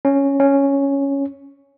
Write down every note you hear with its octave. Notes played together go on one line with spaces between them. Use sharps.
C#4
C#4